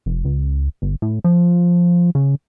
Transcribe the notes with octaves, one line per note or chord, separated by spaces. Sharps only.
F1
C#2
G1
A2
F3
C#3